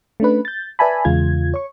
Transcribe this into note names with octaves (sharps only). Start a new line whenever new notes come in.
A3 C#4 D4 B4
G6 A6
B4 D5 E5 G#5 A5 B5
E2 C#3 G#3 F4 G#6
C#5 C#6